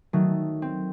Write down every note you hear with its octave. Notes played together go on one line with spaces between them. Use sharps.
D#3 F#3 A3
C4